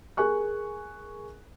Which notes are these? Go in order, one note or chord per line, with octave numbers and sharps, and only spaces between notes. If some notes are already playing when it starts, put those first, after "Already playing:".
G#4 A#4 G#5 C#6 F#6